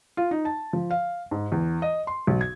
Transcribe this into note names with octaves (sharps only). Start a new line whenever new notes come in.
F4
D#4
A5
F3
F5
G#2
E2
D#5
C6
B1
G#6